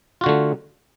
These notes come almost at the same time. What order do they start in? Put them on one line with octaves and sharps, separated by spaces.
F4 F#4 D3 A3